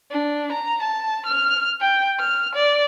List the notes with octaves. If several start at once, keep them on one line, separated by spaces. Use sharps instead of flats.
D4
A#5
A5
F6
G5
F6
D5